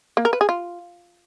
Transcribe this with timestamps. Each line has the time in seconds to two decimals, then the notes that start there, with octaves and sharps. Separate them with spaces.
0.17 A#3
0.25 A#4
0.33 B4
0.41 G#4
0.49 F4